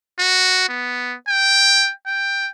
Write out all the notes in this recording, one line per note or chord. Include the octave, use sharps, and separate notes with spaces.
F#4
B3
G5
G5